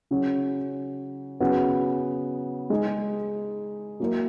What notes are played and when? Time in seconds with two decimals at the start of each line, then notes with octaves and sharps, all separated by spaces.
0.11 C#3 F#3 C#4 F#4
1.40 C#3 F#3 B3
2.70 G#3 D#4 G#4
4.00 F#3 A#3 E4 A#4